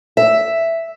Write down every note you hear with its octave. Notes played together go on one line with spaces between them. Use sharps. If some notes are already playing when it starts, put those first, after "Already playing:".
E5